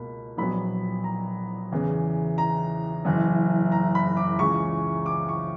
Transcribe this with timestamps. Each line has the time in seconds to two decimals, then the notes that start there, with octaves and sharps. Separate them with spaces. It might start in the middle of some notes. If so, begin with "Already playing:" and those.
Already playing: C#2 B2 A#3 B5
0.37 A#1 A#2 F#3 B3 B5
1.04 A#5
1.72 E2 C#3 E3 B3
2.38 A#5
3.05 F#1 F#2 E3
3.72 A#5
3.95 B5
4.17 D6
4.39 C#2 C#3 E3 C#6
5.06 D6
5.29 C#6